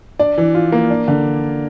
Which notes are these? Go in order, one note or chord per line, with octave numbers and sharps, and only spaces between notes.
D4 D5
E3
F4
A#3
D4
D3